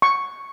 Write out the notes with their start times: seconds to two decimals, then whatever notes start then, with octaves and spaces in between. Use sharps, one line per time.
0.02 C#6